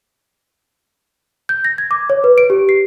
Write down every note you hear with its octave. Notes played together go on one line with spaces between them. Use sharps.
G6
A#6
G#6
D6
C#5
B4
D7
G4
C7